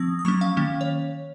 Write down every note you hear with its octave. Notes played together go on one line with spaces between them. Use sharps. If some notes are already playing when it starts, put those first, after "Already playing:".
Already playing: F3 C4 D#6
D#6
F#3 A#3 C#4 C#6
F5
D#3 A#3 C#4
C#5